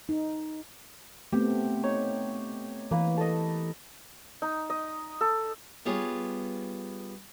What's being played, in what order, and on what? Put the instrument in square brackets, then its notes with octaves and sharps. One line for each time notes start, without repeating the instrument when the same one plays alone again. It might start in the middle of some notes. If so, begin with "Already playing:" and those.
[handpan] D#4
[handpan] A3 B3 C4 [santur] G4
[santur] D#4 C#5
[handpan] E3 [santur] A#3 B4
[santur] A4 D#5
D#4
D#5
A4
[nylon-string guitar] G3 B3 F4 G#4 C#5